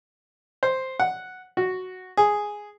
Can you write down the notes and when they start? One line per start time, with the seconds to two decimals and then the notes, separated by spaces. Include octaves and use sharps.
0.63 C5
1.00 F#5
1.57 F#4
2.17 G#4